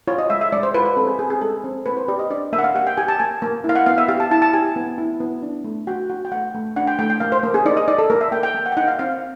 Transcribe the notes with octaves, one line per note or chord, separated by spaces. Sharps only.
F4 C#5
D#5
G#3 E5
E5
G#3 D5
C5
F4 B4
B4
C4 A4
G#4
C4 G#4
G#4
G#3 A4
C4
A#3 B4
C5
G4 D5
D#5
D4 D5
A#3 E5
F#5
F5
G4 F#5
G5
G4 G#5
A5
A#3 G#5
A#3
E4
F5
F#5
B3 F5
E5
G4 F5
A5
E4 A5
A5
G4 G#5
B3
E4
B3
D4
A3
F#4 G5
F#4
G5
A3 F#5
A3
D4 F#5
G5
A3 G5
G5
A#3 F5
C5
A#3
G#4
D#4 D5
D#5
D#4 D5
A4
A#3 A#4
E5
A#3 G5
G5
A#3
F#5
G5
D#4 F#5
F5
C4 F5